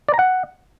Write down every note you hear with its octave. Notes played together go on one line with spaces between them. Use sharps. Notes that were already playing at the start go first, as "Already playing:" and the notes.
D5
A#5
F#5